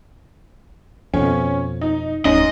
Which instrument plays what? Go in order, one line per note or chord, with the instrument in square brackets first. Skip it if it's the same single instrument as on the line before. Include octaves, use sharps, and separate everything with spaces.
[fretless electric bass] F2 B2 [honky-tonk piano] C#4
[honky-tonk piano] D#4
[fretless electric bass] D1 C#4 [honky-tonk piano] G#2 [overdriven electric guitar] D#5